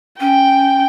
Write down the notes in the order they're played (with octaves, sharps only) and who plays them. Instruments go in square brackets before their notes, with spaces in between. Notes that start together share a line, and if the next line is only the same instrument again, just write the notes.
[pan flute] C#4 [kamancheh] G5